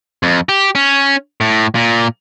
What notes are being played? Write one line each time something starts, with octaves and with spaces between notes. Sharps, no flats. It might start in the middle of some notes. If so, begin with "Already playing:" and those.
F2
G4
C#4
A2
A#2